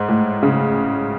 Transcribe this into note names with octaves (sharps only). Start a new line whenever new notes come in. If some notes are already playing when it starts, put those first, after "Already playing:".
Already playing: G#2
A2
C#3